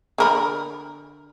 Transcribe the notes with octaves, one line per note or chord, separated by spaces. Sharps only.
D3 A#4 B5